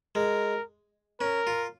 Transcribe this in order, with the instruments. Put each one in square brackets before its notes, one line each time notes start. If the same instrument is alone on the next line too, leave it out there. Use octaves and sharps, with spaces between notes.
[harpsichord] G#3 [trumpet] A#4
[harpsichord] C#4 [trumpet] A#4
[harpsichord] F4